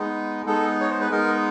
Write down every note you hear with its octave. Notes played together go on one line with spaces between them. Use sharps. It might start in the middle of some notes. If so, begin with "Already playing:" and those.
Already playing: G#3 B3 D#4
G#3 B3 D#4 A4
C#5
C5
B4
G#3 B3 D#4 A#4